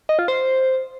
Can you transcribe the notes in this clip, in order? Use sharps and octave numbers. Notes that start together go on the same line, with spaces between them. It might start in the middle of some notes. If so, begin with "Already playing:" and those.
D#5
F4
C5